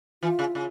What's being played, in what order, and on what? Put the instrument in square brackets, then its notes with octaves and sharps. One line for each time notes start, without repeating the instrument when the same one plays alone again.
[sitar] E3 [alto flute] F4
[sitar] C#3
C#3